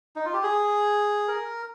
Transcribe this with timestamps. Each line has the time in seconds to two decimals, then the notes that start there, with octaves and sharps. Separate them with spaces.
0.16 D#4
0.25 F4
0.34 G4
0.43 G#4
1.28 A#4